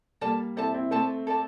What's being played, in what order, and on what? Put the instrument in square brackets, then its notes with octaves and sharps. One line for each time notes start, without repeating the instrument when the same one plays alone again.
[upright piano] G3 A#3 [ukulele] A4 D5 A5
[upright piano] C4 E4 [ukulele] A4 D5 A5
[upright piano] C4 E4
[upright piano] A3 C4 [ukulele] A4 D5 A5
[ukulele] A4 D5 A5